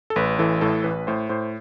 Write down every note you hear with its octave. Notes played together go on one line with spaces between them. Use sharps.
A4
A1 B4
E3 A4
A2 A4
A1 B4
A2 C5
A2 C5